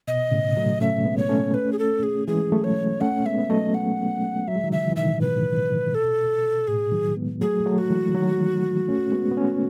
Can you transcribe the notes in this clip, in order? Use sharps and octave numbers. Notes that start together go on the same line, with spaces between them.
B2 D#5
A2 C#3
F#3 A3
A3 C#4 E5
G#3 B3
C#5
A3 C#4
B4
G#4
A4
G#4
E3 G#3 G#4
F#3 A3
C#5
A3 C#4 F#5
G#3 B3 E5
B3
F#3 A3 D#5
F#5
F#3 E5
G#3
D#3 F#3
C#3 E3 E5
E3
B2 D#3 E5
A2
B2 B4
A4
A2 G#4
D#3 F#3
G#3 B3
F#3 A3 G#4
F#3 A3
F#4
E3 G#3
D#3 F#3
A3 C#4
G#3 B3
B3
A3 C#4